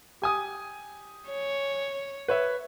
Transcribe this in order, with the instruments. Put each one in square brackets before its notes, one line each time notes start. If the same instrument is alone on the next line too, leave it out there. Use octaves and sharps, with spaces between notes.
[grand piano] G4 G#5 D#6
[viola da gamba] C#5
[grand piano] B4 C#5 E5